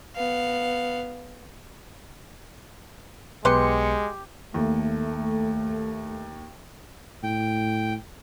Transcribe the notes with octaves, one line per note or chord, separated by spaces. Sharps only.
B3 F5
B1 G#3 B3 G4 B4 C6 C#7
D#2 A3
A2 G5